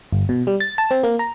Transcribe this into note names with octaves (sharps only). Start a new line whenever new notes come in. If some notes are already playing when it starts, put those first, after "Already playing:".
G1
B2
G3
A6
A5
C4
A#3
A#5